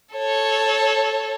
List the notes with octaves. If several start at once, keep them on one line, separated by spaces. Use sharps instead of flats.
A4 C#5